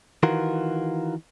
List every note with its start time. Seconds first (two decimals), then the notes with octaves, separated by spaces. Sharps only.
0.23 D#3 E3 F4 F#4 A#4